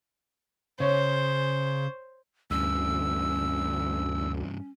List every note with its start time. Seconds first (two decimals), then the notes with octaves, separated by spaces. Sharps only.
0.80 C#3 C5 C#5
2.51 D2 G2 E3 C#4 E6